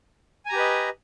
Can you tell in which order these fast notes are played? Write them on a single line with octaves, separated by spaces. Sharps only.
G#5 A#5 G4 B4 D#5